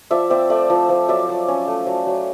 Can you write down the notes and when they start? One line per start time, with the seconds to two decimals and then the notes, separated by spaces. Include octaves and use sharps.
0.11 F3 D5 E5
0.30 C4 D5 E5
0.50 A3 D5 E5
0.70 F3
0.89 F3
1.08 F#3 D5 E5
1.29 F#3
1.48 C#4
1.67 A3
1.87 F#3
2.07 F#3